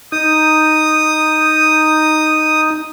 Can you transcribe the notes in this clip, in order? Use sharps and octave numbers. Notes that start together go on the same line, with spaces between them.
D#4 D#6